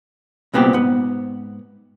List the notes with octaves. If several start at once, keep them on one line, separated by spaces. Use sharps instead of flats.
C2 A#2 B3 C4 G4
G#2 B3